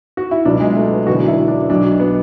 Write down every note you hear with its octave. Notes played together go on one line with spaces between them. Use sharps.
F#4
E4
C#2 B2 F#3 D4
G#3
A3
B3
E1 E2 D3 F#3 F#4
E4
D4
B1 B2 F#3 D4
B3